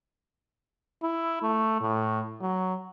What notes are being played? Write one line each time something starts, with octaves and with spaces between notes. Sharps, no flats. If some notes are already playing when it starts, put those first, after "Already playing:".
E4
A3
A2
F#3